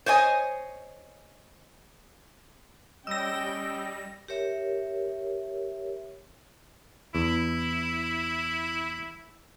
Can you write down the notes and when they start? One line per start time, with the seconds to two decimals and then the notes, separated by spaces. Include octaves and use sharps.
0.06 C5 C#5 D#5 G#5
3.07 G3 C#4 D#5 G5 E6 A#6
4.28 G4 A#4 C#5 E5
7.15 E2 E4